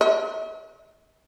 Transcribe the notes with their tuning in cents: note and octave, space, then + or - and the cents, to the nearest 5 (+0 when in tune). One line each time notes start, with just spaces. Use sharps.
D#5 +45